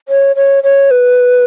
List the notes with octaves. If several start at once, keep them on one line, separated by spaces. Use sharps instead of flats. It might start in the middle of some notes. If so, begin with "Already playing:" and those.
C#5
C#5
C#5
B4